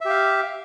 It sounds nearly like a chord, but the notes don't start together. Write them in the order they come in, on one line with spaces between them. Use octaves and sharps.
E5 G4 F5